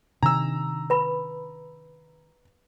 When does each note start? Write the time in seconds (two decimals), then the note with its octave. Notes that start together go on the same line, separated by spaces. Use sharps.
0.23 C3 D#3 D4 A#5 E6
0.90 B4 B5